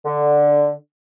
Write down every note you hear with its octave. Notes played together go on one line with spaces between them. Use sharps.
D3